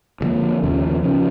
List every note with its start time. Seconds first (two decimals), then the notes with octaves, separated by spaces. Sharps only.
0.21 D2 D3 F3 A#3
0.63 D#2 C#3 F3
1.03 C#3 F3